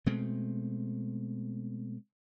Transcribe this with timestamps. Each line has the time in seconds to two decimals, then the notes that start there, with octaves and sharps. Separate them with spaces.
0.06 B2 G#3 A3 C4